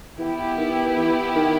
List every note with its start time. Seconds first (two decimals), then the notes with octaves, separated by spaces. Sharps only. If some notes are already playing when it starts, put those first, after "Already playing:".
0.18 E3 B3 E4 G4
0.58 D#3
0.96 E3
1.35 D#3